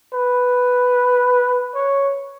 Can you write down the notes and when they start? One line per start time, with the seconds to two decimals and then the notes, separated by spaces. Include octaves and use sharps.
0.13 B4
1.75 C#5